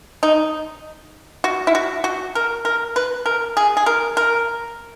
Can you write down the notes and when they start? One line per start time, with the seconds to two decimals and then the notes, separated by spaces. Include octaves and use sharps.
0.23 D#4
1.44 F#4
1.67 E4
1.75 F#4
2.04 F#4
2.35 A#4
2.65 A#4
2.96 B4
3.26 A#4
3.57 G#4
3.77 G#4
3.86 A#4
4.17 A#4